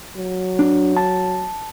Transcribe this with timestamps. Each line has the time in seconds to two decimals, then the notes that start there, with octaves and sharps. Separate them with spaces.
0.17 F#3
0.59 D4
0.97 A5